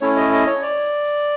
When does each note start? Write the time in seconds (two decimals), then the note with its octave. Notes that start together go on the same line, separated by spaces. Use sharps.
0.01 A3 C#4 E4 C#5
0.16 D#5
0.32 D#5
0.47 C#5
0.62 D5